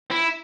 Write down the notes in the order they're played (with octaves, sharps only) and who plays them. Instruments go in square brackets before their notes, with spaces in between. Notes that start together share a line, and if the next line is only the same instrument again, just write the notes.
[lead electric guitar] E4